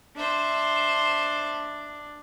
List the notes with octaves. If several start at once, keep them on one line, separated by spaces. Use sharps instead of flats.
D4 C5 E5